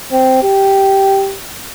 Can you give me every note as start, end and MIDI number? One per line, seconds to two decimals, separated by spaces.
0.12 0.41 60
0.43 1.35 67